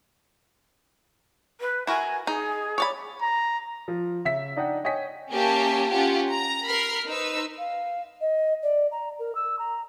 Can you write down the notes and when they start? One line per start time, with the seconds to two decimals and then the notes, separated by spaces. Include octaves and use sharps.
1.61 B4
1.87 E4 F#4 A#4 G#5
2.27 D#4 G#4
2.78 C#5 D5 B5
3.22 A#5
3.88 F3
4.25 C#3 E5 B6
4.56 D4 D#4 D#5 F#5 G5
4.84 C#5 D#5 G5 G#5 B6
5.32 A#3 C#4 G4 E5 G#5 A5
5.90 C#4 F4 G4 F#5
6.31 A#5
6.68 A#4 B5 F6 C7
7.08 D#4 B4 C5 E6
7.59 F5
8.21 D#5
8.63 D5
8.92 A#5
9.19 A#4
9.35 E6
9.59 A#5